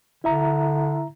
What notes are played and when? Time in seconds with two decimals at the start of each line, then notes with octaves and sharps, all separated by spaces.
0.24 D3 E4 E5 A#5